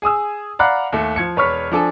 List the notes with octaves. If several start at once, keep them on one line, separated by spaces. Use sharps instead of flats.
G#4 G#5 D#6 E6
D5 F5 F#5 A#5 B5 F#6
D#2 A3
F3 G#6 C#7
E1 B4 C#5 C#6 F6 B6
F3 D4 A4 G#5